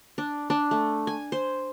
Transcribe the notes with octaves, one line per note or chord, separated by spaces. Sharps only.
D4
D4
A3
G#5
C5